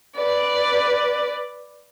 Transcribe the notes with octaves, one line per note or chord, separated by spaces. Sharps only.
B4 D5